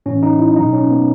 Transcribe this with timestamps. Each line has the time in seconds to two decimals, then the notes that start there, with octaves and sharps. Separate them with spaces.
0.06 A2 E3 C#4
0.23 D#4
0.39 E4
0.56 B2 F#3 D#4
0.73 C#4
0.90 B3